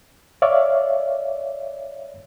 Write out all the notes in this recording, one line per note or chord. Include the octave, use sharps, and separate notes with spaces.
C#5 D5 E5 F5